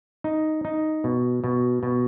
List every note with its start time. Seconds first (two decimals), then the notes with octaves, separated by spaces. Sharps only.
0.24 D#4
0.65 D#4
1.04 B2
1.44 B2
1.83 B2